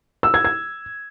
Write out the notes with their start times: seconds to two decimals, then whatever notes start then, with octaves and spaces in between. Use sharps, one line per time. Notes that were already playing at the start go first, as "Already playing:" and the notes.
0.23 E6
0.34 G#6
0.45 G#6